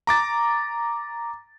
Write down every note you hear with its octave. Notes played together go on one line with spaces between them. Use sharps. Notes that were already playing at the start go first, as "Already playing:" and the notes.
A#5 D6 A6